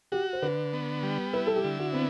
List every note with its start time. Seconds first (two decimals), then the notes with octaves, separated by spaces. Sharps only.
0.12 F#4 G4
0.33 C5
0.43 D3 B4
0.73 B3
1.03 G3
1.33 E4 B4
1.47 A4
1.56 G4
1.64 D3
1.79 F#4
1.92 B3 C4